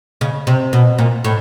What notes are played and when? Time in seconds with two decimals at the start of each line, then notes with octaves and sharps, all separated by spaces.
0.21 C#3
0.47 C3
0.73 B2
0.98 A#2
1.24 A2